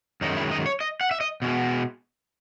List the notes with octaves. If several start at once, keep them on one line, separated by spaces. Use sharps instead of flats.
F#2 D#3 G#3 D#4
E4
D#5
C#5
D#5
F#5
E5
D#5
B2 G#3